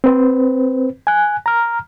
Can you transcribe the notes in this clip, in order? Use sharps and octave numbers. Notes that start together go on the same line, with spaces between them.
C4 B4 C5
G#5 F#6
A#5 F6